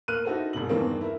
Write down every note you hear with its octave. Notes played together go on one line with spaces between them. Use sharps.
A#3 F6 F#6 D#7
D#4 E4 F#4 A4 C5
E1 A#1 C3 F#7
E2 G2 D#3 E3 A#3 C4
E4 A#4